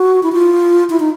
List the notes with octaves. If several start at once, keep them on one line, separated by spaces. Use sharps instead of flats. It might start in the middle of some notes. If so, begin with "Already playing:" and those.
Already playing: F#4
E4
F4
E4
D#4